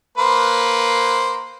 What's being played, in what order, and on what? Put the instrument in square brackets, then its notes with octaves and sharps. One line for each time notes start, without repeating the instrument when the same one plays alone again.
[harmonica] A#3 B4 C5